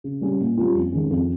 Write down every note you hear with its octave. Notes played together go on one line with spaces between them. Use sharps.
C#3
G3 C#4
A#2
G3 C#4 F4
F2
D#3 G#3 C#4
F2